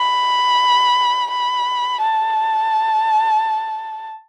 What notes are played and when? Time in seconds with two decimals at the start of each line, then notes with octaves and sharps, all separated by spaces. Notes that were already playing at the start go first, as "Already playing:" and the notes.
Already playing: B5
1.31 B5
2.01 A5